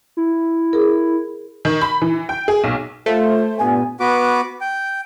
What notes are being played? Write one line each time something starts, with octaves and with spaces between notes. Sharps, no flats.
E4
G#4 A#4
D#3
B5
E3
G5
G#4
B1
A3 F4 C5
G2 A#2 B3 G#5
B3 F#4 B4 D6
G5